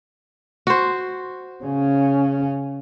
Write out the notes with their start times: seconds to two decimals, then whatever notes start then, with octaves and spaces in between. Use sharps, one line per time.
0.67 F#4 C5
1.65 C#3 C#4